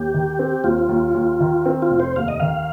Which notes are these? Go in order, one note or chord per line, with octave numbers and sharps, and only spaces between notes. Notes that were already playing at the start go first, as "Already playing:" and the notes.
Already playing: D#2 G4
D#3
C4
D#2 F4
D#2
D#2
D#3
C4
F4
F1
C5
D#2 F5
D#5
D#3 F5